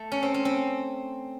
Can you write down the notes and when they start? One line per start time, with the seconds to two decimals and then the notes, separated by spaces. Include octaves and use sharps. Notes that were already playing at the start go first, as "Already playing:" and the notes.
Already playing: A3
0.12 C#4
0.23 C4
0.34 C#4
0.45 C4